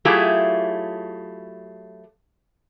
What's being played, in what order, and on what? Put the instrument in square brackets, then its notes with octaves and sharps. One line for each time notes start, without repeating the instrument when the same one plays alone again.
[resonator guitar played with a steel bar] F#3 A3 E4 F4 G4 G#4